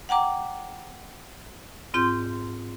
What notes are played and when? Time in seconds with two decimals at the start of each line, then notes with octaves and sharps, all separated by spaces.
0.09 F#5 G5 A#5 D6
1.94 G#2 C4 F4 C6 G6